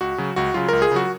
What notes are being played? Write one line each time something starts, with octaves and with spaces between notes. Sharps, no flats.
C#2 F#4
C#3 F#3
C#2 F#4
C#3 F#3 F4
C#2 A#4
G#4
C#3 F#3 F#4